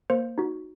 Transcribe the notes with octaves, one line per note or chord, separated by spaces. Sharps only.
A#3 C5
D#4 F#4